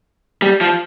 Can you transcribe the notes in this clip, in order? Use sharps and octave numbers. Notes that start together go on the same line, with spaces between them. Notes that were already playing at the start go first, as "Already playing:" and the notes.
G3
F3